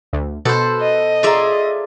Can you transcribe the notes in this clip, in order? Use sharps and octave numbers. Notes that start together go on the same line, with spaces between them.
D2
B2 A4 B4 C5
D#5
F4 G#4 D5 E5 A#5